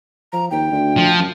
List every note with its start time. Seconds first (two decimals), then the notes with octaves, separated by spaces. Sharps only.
0.33 F3 A#5
0.51 D#2 G5
0.71 D2
0.97 F3
1.19 F#2